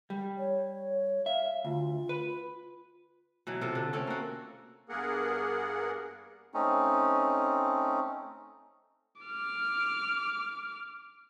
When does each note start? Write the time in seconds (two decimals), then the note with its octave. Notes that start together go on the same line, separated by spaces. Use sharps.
0.10 G3
0.38 C#5
1.26 E5 F5
1.65 D2 F4
2.09 B4
3.47 B2 E3 F#3
3.61 C3 F4 A4
3.75 D3
3.93 A3 C4 C#4 A4
4.07 A#3 F#4
4.89 G2 A#3 B3 G#4 A#4 F#5
6.54 A3 C4 C#4 D#4
9.22 D6 F6